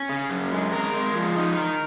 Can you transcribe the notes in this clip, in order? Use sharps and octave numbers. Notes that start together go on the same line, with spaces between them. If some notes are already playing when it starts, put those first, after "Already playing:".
Already playing: C#4
C#3
F#2
G#3
A#4
G#3
F3
D#4
A#4